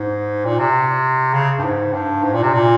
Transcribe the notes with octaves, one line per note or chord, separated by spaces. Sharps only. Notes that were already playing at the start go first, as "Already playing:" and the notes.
Already playing: G#2
A#2
C3
C#3
G2
G#2
G2
G#2
A#2
C3
A#2